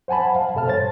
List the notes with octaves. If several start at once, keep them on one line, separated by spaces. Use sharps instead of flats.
C5 F#5 G#5 A5 B5
F5
G2 B2 A4 E5 A5 F6
C5 C#5 A6